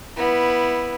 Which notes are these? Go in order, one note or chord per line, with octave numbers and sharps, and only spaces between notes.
B3 E4